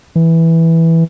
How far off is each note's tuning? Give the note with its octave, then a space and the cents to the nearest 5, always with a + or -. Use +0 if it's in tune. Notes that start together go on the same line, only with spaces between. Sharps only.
E3 -5